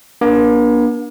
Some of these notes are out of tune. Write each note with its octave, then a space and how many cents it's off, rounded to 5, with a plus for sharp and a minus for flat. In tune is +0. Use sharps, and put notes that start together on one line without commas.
A#3 +40 D4 +0